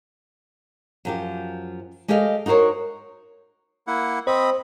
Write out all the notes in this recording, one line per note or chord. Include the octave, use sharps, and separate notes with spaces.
F#2 F3 G4
G#3 G4 A4 D#5 F5
D#4 F#4 A#4 C5 C#5
A#3 E4 F#5
C4 C5 D#5 B5